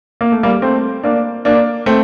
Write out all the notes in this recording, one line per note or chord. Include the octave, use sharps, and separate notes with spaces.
A#3
A3
G3 A#3
A3 C4
A#3 D4
A#3 D4
A3 C4